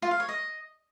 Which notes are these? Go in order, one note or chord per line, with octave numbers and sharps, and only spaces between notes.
F4
F5
C#5
D#5